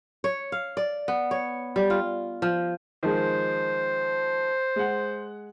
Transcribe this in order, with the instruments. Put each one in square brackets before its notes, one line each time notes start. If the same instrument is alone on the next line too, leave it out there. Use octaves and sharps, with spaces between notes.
[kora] C#5
F5
D5
B3
C#5
G3
F4
F3
[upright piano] D#3 F3 G#3 [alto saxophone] C5
[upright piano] G#3 F#5